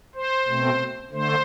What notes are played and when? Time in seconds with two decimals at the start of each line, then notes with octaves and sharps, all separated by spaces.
0.15 C5
0.48 B2 A3 C4
1.12 D3 A3 C5